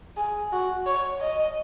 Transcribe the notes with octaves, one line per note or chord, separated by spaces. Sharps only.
G#4
F#4
C#5
D#5